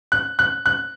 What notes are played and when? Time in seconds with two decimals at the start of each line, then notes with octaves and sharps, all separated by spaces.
0.12 F#6
0.39 F#6
0.66 F#6